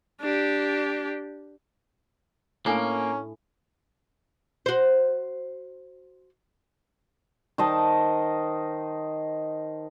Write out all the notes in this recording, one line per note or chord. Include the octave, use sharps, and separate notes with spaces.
D4 G4
A2 A#3 C#4 D4 G#5
F#4 C5
D#3 C5 D#5 A5